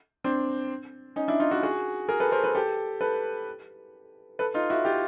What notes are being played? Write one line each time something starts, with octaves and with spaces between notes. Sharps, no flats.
C4 D4
C#4 D#4
D4 E4
D#4 F4
E4 F#4
F#4 G#4
G#4 A#4
A4 B4
A#4 C5
A4 B4
G4 A4
A4 B4
A4 B4
D#4 F4
E4 F#4
F4 G4